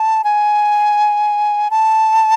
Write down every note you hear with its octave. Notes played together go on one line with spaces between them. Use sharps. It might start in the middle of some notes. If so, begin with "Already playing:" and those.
Already playing: A5
G#5
A5